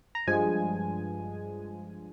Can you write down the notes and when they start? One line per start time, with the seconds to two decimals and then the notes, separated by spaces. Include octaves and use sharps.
0.15 A#5
0.27 G2 F3 G#3 G#5